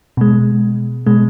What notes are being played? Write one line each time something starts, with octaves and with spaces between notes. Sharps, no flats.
B2 G#3
B2 G#3